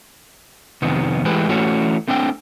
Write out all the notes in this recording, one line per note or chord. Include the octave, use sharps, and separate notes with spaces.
F2 C3 D#3 B3
E3 G#3 A3 G4 B4
E3 A3 C#4 F#4
A3 C4 D4 E5 G5